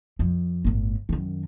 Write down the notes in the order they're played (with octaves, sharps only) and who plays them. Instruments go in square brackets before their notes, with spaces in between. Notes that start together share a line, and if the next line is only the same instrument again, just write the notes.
[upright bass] F2
G1 A2
F#2 D#3